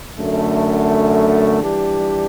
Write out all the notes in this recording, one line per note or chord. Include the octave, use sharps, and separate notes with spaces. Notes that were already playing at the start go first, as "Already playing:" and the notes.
F#2 D3 A3
E3 G3 D4 G4